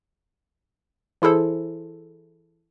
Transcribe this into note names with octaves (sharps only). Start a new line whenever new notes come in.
E3 E4 G#4 A4 C5